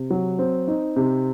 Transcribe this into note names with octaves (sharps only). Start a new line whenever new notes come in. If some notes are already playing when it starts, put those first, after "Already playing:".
Already playing: C3
F#3
C4
D#4
C3